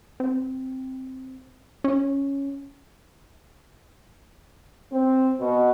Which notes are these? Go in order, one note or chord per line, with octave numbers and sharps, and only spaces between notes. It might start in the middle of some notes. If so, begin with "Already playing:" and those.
C4
C#4
C4
B2